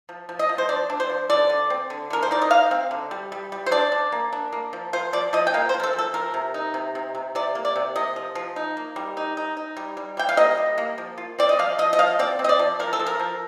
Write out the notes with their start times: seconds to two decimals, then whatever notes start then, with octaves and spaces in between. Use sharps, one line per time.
0.09 F3
0.29 F3
0.39 D#5
0.49 F3
0.58 C5
0.69 D4 D5
0.90 D4
1.00 C5
1.10 F3
1.30 D3 D5
1.50 D3
1.70 C4
1.90 D3
2.10 D3 A#4
2.23 C5
2.31 D#4 D5
2.42 D#5
2.50 D#4 F5
2.71 C4
2.91 D3
3.11 G3
3.32 G3
3.52 G3
3.66 C5
3.71 D4 D5
3.92 D4
4.12 A#3
4.33 D4
4.53 A#3
4.73 F3
4.93 F4 C5
5.13 F3 D5
5.33 F3 D#5
5.47 G5
5.54 A#3 F5
5.69 C5
5.74 F3
5.80 A#4
5.83 A4
5.93 F3
5.99 A4
6.14 F3 A#4
6.34 C3
6.54 D#4
6.74 C3
6.95 C3
7.15 C3
7.35 C3 D5
7.55 A#3
7.65 D5
7.76 C3
7.96 C3 D#5
8.16 F3
8.35 F3
8.56 D#4
8.77 A#3
8.96 G3
9.17 D#4
9.37 D#4
9.57 D#4
9.77 G3
9.97 G3
10.17 G3 G5
10.29 F5
10.37 A#3 D#5
10.58 G3
10.78 A#3
10.98 F3
11.18 F4
11.38 C4 D5
11.49 D#5
11.59 F3 F5
11.78 F3 D#5
11.93 D#5
11.99 F3 F5
12.19 C4 D5
12.39 C4
12.44 D#5
12.49 D5
12.59 F3
12.79 F3 A#4
12.93 A4
12.99 F3
13.07 A#4
13.20 F3